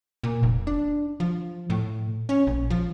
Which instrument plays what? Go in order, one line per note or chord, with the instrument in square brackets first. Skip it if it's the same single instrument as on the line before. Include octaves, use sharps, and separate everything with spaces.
[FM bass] A#2
F1
D4
F3
A2
C#4
A#1
F3